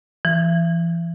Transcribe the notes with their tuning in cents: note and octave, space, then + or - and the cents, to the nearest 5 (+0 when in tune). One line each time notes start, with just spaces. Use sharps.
E3 +35